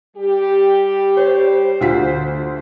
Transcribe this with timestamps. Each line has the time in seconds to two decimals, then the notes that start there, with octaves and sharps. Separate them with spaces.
0.17 G3 G4
1.17 C5 C#5
1.81 D2 F4 B6